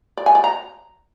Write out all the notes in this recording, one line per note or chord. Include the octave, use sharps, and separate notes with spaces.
D5
G#5
D5
A#5